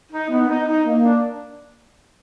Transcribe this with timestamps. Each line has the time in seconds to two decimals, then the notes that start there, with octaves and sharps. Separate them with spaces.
0.11 D#4
0.29 B3
0.48 D#4
0.66 D#4
0.85 A#3
1.03 D4